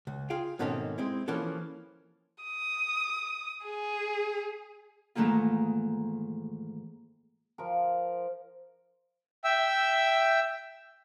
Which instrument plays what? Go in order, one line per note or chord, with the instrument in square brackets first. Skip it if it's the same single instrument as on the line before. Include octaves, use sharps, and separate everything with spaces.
[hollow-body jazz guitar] C#2
F4 G#4 F5 G5
G#2 B2 D#3 A3 C4 C#4
G#3 C4 E4
E3 F3 A#3 C#4 A4
[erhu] D#6
G#4
[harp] G#2 D#3 E3 A3 A#3 F4
[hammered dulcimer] F3 A#4
[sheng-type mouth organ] E5 G5 E6